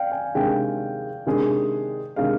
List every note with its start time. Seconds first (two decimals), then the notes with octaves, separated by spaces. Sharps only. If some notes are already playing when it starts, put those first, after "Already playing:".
Already playing: D5 F5 G5
0.12 G#5
0.35 C3 D#3 G#3 D4 G#4 G5
1.26 C3 D#3 G#3 D4 G#4
2.16 C3 D#3 G#3 D4 G#4 F5